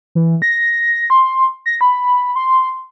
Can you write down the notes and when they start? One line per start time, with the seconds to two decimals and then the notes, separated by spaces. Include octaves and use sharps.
0.15 E3
0.42 A#6
1.10 C6
1.66 A#6
1.81 B5
2.36 C6